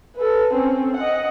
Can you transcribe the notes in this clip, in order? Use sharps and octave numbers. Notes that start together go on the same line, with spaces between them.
A4 B4
C4 C#4
D#5 F#5